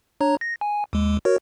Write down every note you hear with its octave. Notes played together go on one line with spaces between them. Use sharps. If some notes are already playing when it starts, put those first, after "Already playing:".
D4 C#5 A#5
A#6
G#5
D#2 G#3
F#4 A#4 C#5